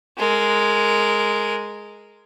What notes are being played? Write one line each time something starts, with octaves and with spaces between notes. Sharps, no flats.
G#3 A#4